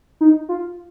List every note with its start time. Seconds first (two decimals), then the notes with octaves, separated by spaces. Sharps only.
0.21 D#4
0.49 F4